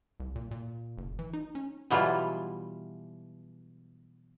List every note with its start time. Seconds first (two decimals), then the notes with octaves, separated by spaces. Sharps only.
0.20 C2
0.36 A#2
0.51 A#2
0.98 F#1
1.19 E3
1.33 D#4
1.55 C#4
1.90 B2 E3 F#3 G3 E4 F4